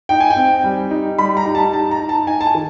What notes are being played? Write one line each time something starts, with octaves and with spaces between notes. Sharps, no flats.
D#4 G5
G#5
G5
C4
G3
D#4
G3 B5
A#5
D#4
A5
D#4 A5
A#5
D#4
A5
D#4 G#5
A5
G#5
D#3